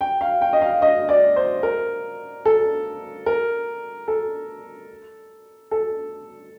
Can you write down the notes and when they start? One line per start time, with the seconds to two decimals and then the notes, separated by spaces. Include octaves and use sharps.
0.01 G5
0.21 F5
0.41 G5
0.53 D#5
0.62 F5
0.82 D#5
1.09 D5
1.36 C5
1.63 A#4
2.45 A4
3.26 A#4
4.08 A4
5.71 A4